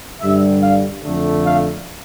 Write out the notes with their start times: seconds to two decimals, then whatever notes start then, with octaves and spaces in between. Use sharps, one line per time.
0.21 G2 D3 G3 E5
0.63 F5
1.04 F2 D3 A3
1.46 F5